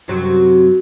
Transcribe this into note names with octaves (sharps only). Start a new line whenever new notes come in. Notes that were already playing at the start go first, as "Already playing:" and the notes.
F#2 C3 F#3